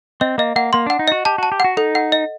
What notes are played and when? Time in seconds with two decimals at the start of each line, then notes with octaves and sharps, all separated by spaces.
0.21 C4 D#5
0.38 A#3 D#5
0.56 A#3 F#5
0.73 A#3 C6
0.86 D4 F#5
0.99 D#4
1.08 F#4 D#5
1.25 G4 A5
1.38 F#4 A5
1.52 G4
1.60 F#4 F#5
1.77 D#4 A4
1.95 F#5
2.12 D#5